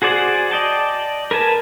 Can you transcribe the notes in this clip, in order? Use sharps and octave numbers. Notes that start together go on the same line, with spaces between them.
F#4 G#4 C5 D5 F#5
D5 D#5 G5 A5
A#4 B4 G#5 A5